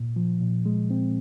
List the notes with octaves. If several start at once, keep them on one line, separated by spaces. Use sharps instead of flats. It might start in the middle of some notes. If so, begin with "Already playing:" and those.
Already playing: A#2
F3
A#2
G#3
C4